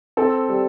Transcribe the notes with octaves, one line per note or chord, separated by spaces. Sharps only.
C4 A4
G3